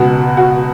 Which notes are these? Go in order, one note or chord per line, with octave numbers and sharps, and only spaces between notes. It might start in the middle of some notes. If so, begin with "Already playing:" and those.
Already playing: C#2 B2 F#4
F#4